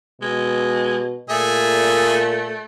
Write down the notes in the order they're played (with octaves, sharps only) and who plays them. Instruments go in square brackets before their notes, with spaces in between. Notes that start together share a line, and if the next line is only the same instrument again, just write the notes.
[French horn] B2 [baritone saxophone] G#3
[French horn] A#2 [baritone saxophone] A3 [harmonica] G#4 E5